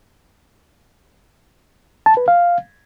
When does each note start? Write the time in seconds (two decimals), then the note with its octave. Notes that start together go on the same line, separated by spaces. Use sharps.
2.06 A5
2.17 B4
2.28 F5